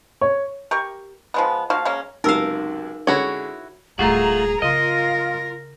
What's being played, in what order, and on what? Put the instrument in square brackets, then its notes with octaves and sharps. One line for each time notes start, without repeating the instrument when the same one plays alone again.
[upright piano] C#5
[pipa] G4 A#4 C#6
F3 G#3 B3
F3 A#3 F#4 F5
G#3 A#3 C#4
[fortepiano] C#2 F#2 C3 [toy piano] D#4 E6 [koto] A#4 F5
[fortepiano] D3 G#3 C#4 [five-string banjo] E4 F#4 C#5
[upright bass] D1 G3 [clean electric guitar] A3 F4 F#4 [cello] G#4 [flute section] A#5
[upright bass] C#3 [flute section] F4 [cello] A#4 [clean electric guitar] D#5